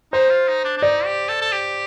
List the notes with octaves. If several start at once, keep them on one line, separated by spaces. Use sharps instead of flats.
D#4 C5
F4
D#4
D4
D4
D#4 D5
G4
A4
A4
G4